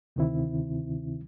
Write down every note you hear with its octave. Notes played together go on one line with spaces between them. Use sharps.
D2 C3 D#3 C4 E4